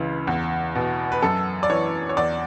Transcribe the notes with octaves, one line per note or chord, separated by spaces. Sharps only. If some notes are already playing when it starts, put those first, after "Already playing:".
Already playing: C#2 C#3 E3
E2
B2
B4
F#2 A4
D5
E3 C#5
C#5
E2 D5